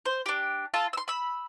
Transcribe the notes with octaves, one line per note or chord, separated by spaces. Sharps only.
C5
D4 G4
F4 A4 A5
C6 E6
B5 E6